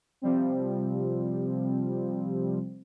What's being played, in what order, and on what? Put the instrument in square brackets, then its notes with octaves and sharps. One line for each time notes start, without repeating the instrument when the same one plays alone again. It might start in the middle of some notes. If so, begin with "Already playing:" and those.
[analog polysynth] C3 F3 G3 C4